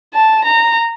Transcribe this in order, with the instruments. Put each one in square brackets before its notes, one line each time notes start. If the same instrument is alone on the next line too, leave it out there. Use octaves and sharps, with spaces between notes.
[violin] A5
A#5